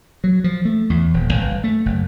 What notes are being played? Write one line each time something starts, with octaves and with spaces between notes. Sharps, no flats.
F#3
F3
A3
E2
D#1
G1
A3
F#1